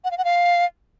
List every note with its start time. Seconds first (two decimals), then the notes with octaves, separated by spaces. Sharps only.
0.04 F#5
0.11 F5
0.18 F#5
0.24 F5